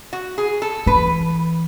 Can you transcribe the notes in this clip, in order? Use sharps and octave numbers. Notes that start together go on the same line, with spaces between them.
F#4
G#4
A4
E3 B4